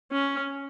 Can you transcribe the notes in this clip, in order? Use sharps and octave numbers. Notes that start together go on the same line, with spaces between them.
C#4